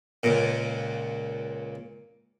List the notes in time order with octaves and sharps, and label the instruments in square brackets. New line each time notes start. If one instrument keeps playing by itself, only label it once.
[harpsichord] C#2 A#2